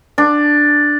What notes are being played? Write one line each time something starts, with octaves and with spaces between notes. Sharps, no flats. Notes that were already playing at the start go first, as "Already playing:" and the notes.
D4